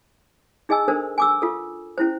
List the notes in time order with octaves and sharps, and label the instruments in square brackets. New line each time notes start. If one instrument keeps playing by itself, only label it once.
[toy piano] D#4 G#4 D#5 G#5 E6
D4 A4 A#4 C5
G#5 D6 E6
F4 A4
C#4 E4 C5